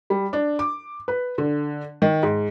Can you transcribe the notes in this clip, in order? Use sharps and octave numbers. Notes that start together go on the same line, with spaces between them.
G3
D4
D6
B4
D3
D#3
G#2